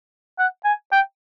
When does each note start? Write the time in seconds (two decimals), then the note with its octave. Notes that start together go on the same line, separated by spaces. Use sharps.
0.39 F#5
0.65 G#5
0.92 G5